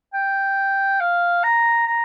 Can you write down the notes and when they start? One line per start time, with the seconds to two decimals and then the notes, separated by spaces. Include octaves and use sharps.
0.14 G5
1.00 F5
1.44 A#5
1.87 A#5